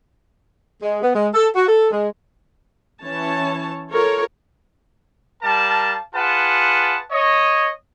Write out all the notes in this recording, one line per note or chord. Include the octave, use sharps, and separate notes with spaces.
G#3
B3
G#3
A4
F#4
A4
G#3
E3 C#4 C#5 A5
F4 A4 A#4 C#5
G3 A#4 F5 A5
F4 G#4 B4 F#5 A5
C#5 D#5